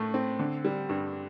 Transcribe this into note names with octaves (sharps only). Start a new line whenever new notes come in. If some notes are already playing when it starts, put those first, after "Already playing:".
Already playing: A2 A3
C4
D3
G3
G2